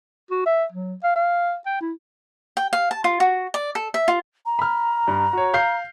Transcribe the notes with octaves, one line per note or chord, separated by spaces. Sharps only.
F#4
E5
F#3
F5
F5
G5
E4
G5
F5
A5
F4
F#4
D5
A4
E5
F4
A#5
B5 F6
G2
F#4 C#5
F5 G6 C7